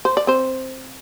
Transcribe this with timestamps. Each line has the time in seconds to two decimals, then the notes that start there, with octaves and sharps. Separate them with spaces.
0.05 C5
0.17 D5
0.27 C4 C5